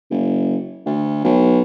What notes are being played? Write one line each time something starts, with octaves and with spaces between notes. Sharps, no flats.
F#1
D2
B1